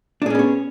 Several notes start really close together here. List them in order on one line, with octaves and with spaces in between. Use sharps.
D4 G#4 C#4 B3 C#5